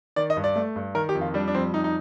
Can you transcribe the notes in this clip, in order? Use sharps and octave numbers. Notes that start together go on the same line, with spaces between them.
D#3 D5
D#5
G2
D5
A3
G2
D#3 A#4
G4
F2
F4
G3 D4
D4
F2 C4
G3 D#4
D#4